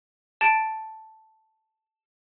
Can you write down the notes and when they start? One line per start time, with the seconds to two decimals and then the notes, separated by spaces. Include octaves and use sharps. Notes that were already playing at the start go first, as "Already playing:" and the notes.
0.41 A5 A6 D7